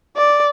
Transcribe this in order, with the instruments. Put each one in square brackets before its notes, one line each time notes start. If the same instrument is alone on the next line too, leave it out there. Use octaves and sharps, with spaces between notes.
[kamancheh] D5